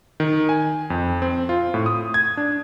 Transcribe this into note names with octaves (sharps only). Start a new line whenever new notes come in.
D#3
G#5
F2
C4
F4
A2
D#6
G#6
D4